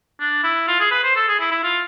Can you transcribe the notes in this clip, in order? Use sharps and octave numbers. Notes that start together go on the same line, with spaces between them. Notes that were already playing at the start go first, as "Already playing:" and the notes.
D4
E4
F4
G#4
B4
C5
A4
G#4
E4
E4
F4